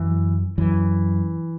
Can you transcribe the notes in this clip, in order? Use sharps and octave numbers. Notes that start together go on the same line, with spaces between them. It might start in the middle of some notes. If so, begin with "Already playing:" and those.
Already playing: F#2 E3
F#2 E3